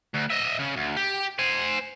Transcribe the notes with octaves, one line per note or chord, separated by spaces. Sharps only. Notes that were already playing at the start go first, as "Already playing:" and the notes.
D2
D#5 E5
C#3
D2
G4
C5 G#5